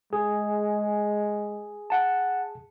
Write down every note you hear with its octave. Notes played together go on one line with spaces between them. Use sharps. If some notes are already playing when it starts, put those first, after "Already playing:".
G#3 G#4
F#5 A5